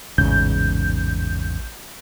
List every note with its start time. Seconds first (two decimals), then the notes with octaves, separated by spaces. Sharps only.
0.18 A1 E2 G#2 C#3 G6